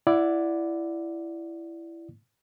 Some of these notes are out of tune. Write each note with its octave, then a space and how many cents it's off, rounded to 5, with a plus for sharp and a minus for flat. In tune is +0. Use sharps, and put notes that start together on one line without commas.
E4 +15 D5 +0 F#5 -15